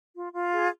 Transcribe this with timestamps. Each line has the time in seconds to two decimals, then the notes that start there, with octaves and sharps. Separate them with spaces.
0.15 F4
0.32 F4
0.52 G#4